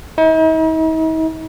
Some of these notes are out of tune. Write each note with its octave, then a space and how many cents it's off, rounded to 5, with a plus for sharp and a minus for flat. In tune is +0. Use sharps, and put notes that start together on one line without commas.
D#4 +45